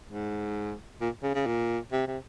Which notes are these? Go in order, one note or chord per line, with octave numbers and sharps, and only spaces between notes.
G#2
A#2
C#3
C#3
A#2
C3
C3